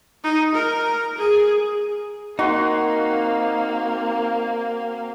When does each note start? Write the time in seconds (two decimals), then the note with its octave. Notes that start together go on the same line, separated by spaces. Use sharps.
0.23 D#4
0.54 A#4
1.17 G#4
2.39 A#3 C4 D#4 F#4 C6